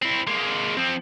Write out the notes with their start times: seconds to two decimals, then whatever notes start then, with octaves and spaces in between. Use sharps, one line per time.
0.02 C4 E4
0.27 G#3 A#3
0.77 F3 C4